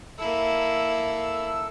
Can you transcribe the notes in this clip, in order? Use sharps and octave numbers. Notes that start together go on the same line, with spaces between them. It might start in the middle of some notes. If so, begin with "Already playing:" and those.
A#3 E4 A4 E6